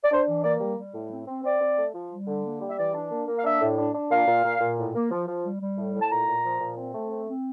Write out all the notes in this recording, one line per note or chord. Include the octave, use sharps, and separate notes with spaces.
D5
D4 C5
E3
A#3 D5
G3
G3
A2
C4
C4
C4 D5
C4
A3
F3
G3
D3
A#3
G3
E5
E3 D5
D4
A#3
A#3
F5
D4 E5
A2
D4
D4
A#2 F5
A#2
A#2
A#2
A2
A#3
F3
F3
G3
G3
A2
A2
A5
A#2 A#5
A#2
F3
A#2
C4
A3
C4
C4